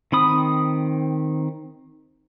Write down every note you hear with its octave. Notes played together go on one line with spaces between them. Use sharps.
D#3 C4 B5 D#6